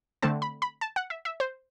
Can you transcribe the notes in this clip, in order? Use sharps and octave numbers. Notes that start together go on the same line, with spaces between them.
D3 A3 C4 A5
B5
B5
A5
F#5
E5
E5
C5